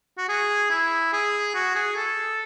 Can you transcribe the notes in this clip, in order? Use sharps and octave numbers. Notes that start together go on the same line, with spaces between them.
F#4
G#4
E4
G#4
F#4
G#4
A4